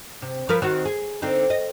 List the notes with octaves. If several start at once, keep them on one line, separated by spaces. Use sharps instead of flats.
C3
F3 A#4 B4
D#3 C4 F#4
G#4
D3 C4 D#4
D#5